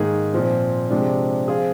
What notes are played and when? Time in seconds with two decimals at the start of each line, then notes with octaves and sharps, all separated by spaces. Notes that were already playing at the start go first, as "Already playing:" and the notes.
Already playing: G#2 D#3 A#3 D#4 G#4
0.33 A#2 F3 C4
0.90 C3 F3 G#3 D4
1.48 F3 C4 F4 G#4